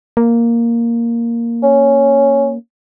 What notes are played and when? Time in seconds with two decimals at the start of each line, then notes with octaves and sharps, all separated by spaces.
0.17 A#3
1.63 C#4